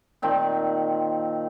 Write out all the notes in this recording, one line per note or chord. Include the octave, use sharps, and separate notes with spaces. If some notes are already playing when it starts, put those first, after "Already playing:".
A#2 D#3 C4 A5